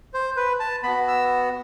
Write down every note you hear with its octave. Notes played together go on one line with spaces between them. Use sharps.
C5
B4
A5
B3 F#4 B5
E6